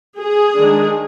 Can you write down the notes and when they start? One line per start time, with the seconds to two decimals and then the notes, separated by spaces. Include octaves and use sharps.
0.19 G#4
0.55 D#3 G#3 D4